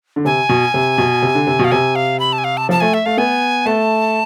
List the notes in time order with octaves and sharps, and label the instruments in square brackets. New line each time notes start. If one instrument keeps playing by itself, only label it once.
[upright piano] D3
[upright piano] C3 [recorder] G#5
[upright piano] B2
C3
B2
C3
D3
C3
B2
[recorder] F5
[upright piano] C3 [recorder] G#5
[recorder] F5
B5
A5
G#5
F5
A5
[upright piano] F3 [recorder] A5
[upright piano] A3 [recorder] G#5
[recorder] E5
[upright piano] A3 [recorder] F5
[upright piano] B3 [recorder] G#5
[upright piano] A3 [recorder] A5